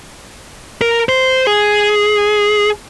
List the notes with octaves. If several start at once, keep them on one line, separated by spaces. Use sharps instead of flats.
A#4
C5
G#4